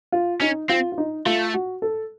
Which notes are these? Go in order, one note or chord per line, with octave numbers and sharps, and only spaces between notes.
F4
C#4 D#4
C4 F4
F4
D#4
A3 F4
F#4
A4